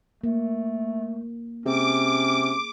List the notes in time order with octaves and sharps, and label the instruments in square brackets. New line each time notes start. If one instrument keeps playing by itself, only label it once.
[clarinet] A3 [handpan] A#3
[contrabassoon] C3 [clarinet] C#4 [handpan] G#4 [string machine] D6